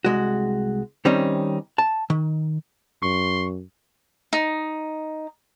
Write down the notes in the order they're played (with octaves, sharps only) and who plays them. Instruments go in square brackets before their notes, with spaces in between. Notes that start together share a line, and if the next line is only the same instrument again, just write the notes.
[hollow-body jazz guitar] C2 G#3 F#4
D#3 G3 C4 C#4 D#4
A5
D#3
[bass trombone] F#2 [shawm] C6 [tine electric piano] C#6
[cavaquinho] D#4